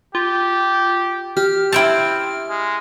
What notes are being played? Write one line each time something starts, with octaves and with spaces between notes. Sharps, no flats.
F4 G4
G4 F6
C4 E4 G5 A5
G#3